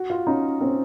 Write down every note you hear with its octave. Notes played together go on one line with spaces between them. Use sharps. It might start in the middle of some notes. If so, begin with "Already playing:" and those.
Already playing: F#4
F4
C#4 D#4
C4 C#4